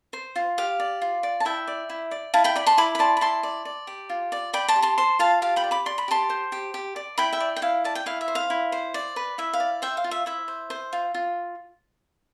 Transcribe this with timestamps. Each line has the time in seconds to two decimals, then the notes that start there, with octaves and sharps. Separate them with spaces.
0.13 C5
0.36 F4
0.58 G4 F5
0.80 D5
1.02 F4
1.23 D5
1.40 A5
1.45 E4 E5 G5
1.68 D5
1.90 E4
2.11 D5
2.34 E4 F5 A5
2.44 G5 B5
2.56 D5 B5
2.67 A5 C6
2.78 E4 B5 D6
2.95 B5
2.99 D5 A5 C6
3.17 B5
3.21 E4 A5 C6
3.43 D5
3.65 D5
3.87 G4
4.10 F4
4.32 D5
4.53 D5 G5 B5
4.68 A5 C6
4.76 G4
4.82 A5 C6
4.98 C5 A5 C6
5.19 F4 F5 A5
5.42 G4 F5 A5
5.56 G5 B5
5.64 D5
5.71 B5 D6
5.86 D5 C6
5.98 B5
6.08 G4 A5 C6
6.30 C5
6.52 G4
6.74 G4
6.96 D5
7.18 E4 G5 B5
7.33 E5 G5
7.40 D5
7.56 G5
7.62 E4 F5
7.84 D5 A5
7.95 G5
8.06 E4 F5
8.21 E5
8.28 C5
8.35 F5
8.50 E4
8.72 C5
8.94 D5
9.16 B4
9.38 E4 E5
9.53 F5
9.60 D5
9.82 C5 E5 G5
9.97 F5
10.04 F4
10.11 E5
10.26 E4 E5
10.48 C5
10.70 C5
10.93 F4
11.14 F4